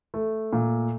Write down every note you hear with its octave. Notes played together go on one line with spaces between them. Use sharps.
A3
A#2